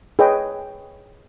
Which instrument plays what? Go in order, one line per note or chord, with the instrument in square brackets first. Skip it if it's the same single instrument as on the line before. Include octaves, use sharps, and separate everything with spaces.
[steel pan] G#4 B4 C#5 D#5 G5 G#5